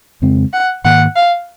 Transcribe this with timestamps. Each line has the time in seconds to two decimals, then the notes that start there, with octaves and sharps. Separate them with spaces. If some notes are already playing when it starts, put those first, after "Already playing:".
0.22 F2 C#3 G#3 C4
0.53 F#5
0.84 G#2 D#3 A#3 F#5
1.16 F5